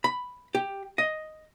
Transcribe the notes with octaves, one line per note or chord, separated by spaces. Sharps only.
B5
G4
D#5